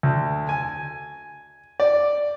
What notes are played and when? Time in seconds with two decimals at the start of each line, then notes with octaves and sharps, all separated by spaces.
0.03 D2
0.49 G#5
1.80 D5